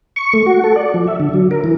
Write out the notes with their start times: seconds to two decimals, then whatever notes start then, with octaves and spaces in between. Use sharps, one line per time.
0.16 C#6
0.33 A3
0.46 F#4
0.64 A4
0.76 D5
0.94 F3
1.07 E5
1.20 D3
1.34 F#3
1.51 A#4
1.64 E3